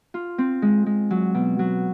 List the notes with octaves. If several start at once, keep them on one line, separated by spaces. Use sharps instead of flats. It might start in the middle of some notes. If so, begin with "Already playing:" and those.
F4
C4
G#3
G#3
F#3
B2
F#3